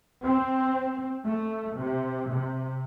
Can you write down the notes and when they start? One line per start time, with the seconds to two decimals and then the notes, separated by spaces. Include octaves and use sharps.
0.25 C4
1.26 A3
1.77 C3
2.32 C3